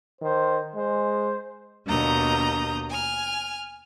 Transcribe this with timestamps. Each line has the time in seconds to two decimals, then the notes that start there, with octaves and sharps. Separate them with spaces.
0.21 D#3 C5
0.74 G#3 C5
1.86 D#2 B2 D4 A#5 D#6 G6
2.89 G#5 F6